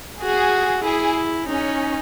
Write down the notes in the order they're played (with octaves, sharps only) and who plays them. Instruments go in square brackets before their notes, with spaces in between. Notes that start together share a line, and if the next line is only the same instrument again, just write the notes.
[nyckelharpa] F#4 [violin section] G#4
[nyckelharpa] E4 [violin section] G#4
[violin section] C#4 [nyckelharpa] D#4